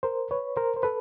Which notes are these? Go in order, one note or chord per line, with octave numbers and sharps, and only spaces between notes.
A#4 C5
B4 C#5
A#4 C5
C5
A4 B4